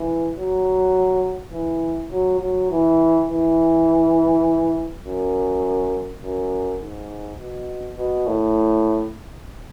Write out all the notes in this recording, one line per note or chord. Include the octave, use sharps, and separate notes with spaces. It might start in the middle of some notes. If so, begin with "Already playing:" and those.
Already playing: E3
F#3
E3
F#3
F#3
E3
E3
F#2
F#2
G#2
B2
B2
A2